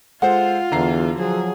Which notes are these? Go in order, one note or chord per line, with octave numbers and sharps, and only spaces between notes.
G#3 F4 A4 C5 F#5
E2 D3 A#5 C7
F3 F#3 G#4